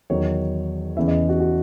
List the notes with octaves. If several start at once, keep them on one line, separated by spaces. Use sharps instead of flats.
E2 D#3 F#3 C#5
E2 C#3 E3 E5
D#5
F#4
F#4